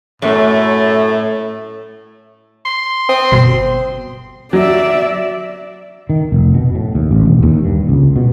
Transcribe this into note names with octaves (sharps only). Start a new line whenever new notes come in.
F#2 A2 A3
C6
C4 D#6
G1 B2 C6
F#3 D5 E5
D#3
F1
B2
A2
D#2
A1
E1
D#2
G2
C#2
B2